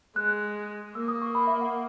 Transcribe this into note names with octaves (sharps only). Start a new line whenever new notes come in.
G#3 F#6
A#3 E6
D#6
C#6
B5
E5
F#5